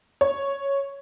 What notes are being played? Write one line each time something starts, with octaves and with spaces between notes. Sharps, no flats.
C#5